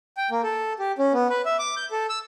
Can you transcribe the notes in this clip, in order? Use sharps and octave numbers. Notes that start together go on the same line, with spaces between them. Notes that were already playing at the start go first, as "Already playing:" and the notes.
G5
A#3
A4
G4
C#4
B3
B4
E5
D6
G6
A4
E6